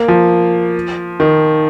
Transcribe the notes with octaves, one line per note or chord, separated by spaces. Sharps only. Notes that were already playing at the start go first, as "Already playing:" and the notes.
Already playing: A#3
F3
D#3